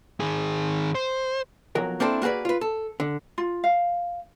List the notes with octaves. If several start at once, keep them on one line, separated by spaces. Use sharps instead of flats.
D#3 G#4
C5
B1 F2 F#3 A#4
A#3 C4 D4 E4 A4 C5
A#3 F#4 G#4 B4 D5
F4 B4
A4
D3
F4
F5